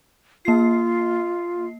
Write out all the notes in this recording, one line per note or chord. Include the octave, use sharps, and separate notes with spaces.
A#3 F4 C7